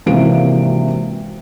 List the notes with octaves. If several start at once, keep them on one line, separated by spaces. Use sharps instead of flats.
G#1 C3 E3 A#3 F#4 D7